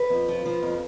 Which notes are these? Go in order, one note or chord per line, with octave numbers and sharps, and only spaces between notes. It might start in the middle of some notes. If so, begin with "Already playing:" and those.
Already playing: B4
F2
F3
F3
F2